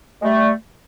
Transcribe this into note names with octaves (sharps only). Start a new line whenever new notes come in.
G#3
G3 A3